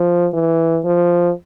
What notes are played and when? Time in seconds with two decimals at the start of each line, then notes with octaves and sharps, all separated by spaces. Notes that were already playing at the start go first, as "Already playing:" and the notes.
Already playing: F3
0.33 E3
0.85 F3